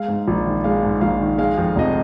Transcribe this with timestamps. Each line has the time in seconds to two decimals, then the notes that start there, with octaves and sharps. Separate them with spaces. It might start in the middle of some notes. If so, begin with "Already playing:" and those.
Already playing: G#3 F5
0.08 G#2
0.27 A#1
0.45 D#3
0.64 G#3 F5
0.83 G#2
1.01 A#1 F5
1.21 D#3
1.38 G#3 F5
1.57 F2
1.76 F1 D#5